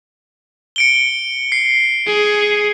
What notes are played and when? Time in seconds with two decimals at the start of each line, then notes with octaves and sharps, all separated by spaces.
0.76 C#7 D7 G7
1.52 C7
2.07 G#4